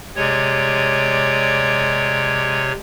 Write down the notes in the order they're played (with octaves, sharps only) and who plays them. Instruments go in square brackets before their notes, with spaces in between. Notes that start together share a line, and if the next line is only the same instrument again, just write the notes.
[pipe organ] C3 C#5 [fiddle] G#3 D5